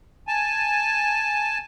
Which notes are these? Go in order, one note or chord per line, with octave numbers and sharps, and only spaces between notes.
G#5 A5